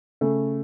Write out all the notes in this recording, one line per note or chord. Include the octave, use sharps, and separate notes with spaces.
C#3 A3